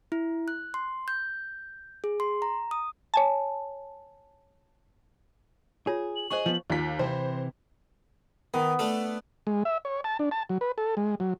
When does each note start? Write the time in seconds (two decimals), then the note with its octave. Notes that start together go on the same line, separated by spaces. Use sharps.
0.12 E4
0.48 F#6
0.74 C6
1.08 G6
2.04 G#4
2.20 C6
2.42 A#5
2.71 D#6
3.14 C#5 G#5 A5
5.87 F4 G#4 C#5
6.16 F#7
6.31 G#4 C5 D#5 G#5 C#6
6.46 F3 B3
6.70 D#2 F4 B6
6.99 C3 E3 C4 C5
8.54 D#3 B3
8.79 A3 D4 A4
9.47 G#3
9.65 E5
9.85 C#5
10.04 A5
10.19 D4
10.31 A5
10.49 F#3
10.61 B4
10.78 A4
10.97 G#3
11.20 F#3